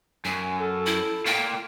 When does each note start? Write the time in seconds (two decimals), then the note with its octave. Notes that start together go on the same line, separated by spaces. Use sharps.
0.25 F#2 G#5
0.60 A4
0.86 E4
1.26 A#3 F4 G5